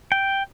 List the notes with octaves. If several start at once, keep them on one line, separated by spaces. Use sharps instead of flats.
G5